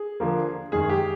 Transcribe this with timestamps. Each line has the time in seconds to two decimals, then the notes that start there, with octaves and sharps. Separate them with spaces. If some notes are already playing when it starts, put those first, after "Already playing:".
Already playing: G#4
0.20 D3 F3 A#3
0.72 F#2 D#3 G#3 G#4
0.89 G4